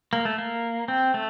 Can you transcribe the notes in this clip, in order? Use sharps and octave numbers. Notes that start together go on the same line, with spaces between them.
A#3
A3
A#3
C4
A3